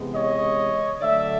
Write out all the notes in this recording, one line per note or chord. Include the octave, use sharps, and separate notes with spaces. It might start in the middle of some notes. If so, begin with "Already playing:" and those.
Already playing: C3 E3 G#3 B3
C#5 D#5
D3 F#3 A3 D5 E5